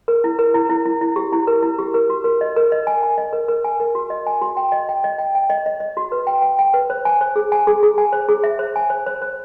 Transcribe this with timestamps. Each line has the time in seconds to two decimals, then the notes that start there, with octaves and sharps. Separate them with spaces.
0.08 A#4
0.24 E4
0.39 A#4
0.54 E4
0.70 E4
0.86 E4
1.01 E4
1.16 G4
1.32 E4
1.47 A#4
1.62 E4
1.79 G4
1.94 A#4
2.10 F#4
2.24 A#4
2.41 D#5
2.56 A#4
2.72 D#5
2.87 G#5
3.03 G#5
3.18 D#5
3.33 A#4
3.48 A#4
3.64 G#5
3.80 A#4
3.95 F#4
4.10 D#5
4.27 G#5
4.42 F#4
4.57 G5
4.72 D#5
4.89 G5
5.04 D#5
5.18 G5
5.35 G5
5.50 D#5
5.66 D#5
5.80 D#5
5.97 F#4
6.12 B4
6.27 G5
6.42 G5
6.59 G5
6.74 B4
6.90 C5
7.05 G#5
7.21 C5
7.36 G#4
7.52 G#5
7.67 G#4
7.83 G#4
7.98 G#5
8.13 C5
8.29 G#4
8.43 E5
8.59 C5
8.76 G#5
8.90 C5
9.06 C5
9.22 C5